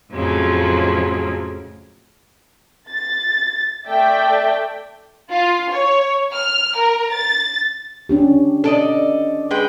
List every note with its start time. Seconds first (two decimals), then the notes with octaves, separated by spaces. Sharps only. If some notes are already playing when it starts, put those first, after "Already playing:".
0.13 F2 A2 C#3 F3 F#3
2.90 A6
3.88 A3 D5 E5 G5 A5
5.30 F4
5.71 C#5
6.33 F6
6.78 A#4
7.12 A6
8.09 C#4 D4 G4
8.64 A4 D5 D#5
9.51 G#3 B4 G5